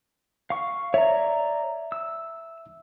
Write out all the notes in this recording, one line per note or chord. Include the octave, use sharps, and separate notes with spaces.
F5 C#6
C#5 D5 E5 A#5
E6